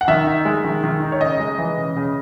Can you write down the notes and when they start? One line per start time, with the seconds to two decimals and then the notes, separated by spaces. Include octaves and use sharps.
0.01 F#5
0.08 D#3 E5
0.27 D#4
0.45 G#3
0.64 D#3
0.84 D#3
1.02 D#4
1.12 C#5
1.20 C#3 D#5
1.40 G#3
1.58 E3
1.77 C#3
1.97 C#3